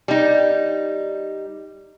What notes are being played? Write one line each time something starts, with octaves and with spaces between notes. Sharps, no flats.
G3 D#4